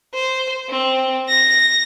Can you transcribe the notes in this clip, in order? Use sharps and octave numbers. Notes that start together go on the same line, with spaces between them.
C5
C4
A#6